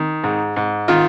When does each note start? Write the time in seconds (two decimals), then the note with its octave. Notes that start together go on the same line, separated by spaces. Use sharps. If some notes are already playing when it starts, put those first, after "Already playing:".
Already playing: D#3
0.24 G#2
0.56 G#2
0.88 D#3 F4